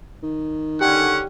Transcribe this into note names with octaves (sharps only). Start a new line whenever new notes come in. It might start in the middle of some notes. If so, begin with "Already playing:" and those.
D#3
D3 C#4 G4 F#5 G5